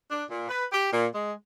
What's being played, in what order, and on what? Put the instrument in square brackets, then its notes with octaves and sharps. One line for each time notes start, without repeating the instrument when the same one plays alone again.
[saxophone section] D4
A#2
B4
G4
A#2
G#3